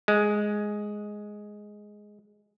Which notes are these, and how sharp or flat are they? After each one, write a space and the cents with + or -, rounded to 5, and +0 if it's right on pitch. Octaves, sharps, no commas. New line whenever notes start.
G#3 +5